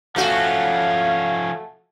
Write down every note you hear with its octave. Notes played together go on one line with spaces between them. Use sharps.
F3 A3 C#4 F#4 F5